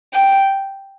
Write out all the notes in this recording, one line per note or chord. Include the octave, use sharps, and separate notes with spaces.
G5